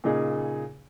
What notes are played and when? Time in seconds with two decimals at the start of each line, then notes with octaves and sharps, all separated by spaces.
0.04 A#2 C#3 D#4 G#4